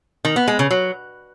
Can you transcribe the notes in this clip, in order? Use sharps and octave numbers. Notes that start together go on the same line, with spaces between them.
D#3
B3
G#3
C#3
F#3